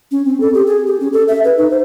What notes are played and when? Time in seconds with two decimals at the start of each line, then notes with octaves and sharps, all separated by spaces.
0.12 C#4
0.26 C4
0.40 A4
0.54 G4
0.67 G#4
0.87 G4
1.00 C#4
1.13 A4
1.28 E5
1.44 B4
1.57 D#4
1.70 C5